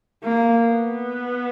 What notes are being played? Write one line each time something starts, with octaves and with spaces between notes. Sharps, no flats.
A#3
B3